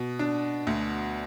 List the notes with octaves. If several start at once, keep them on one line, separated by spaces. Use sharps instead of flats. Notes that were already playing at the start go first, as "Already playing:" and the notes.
Already playing: B2
D4
D2